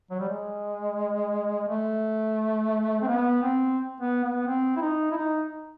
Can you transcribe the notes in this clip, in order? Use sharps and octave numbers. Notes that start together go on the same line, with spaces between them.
F#3
G3
G#3
A3
C4
B3
C4
B3
B3
C4
E4
D#4
E4
D#4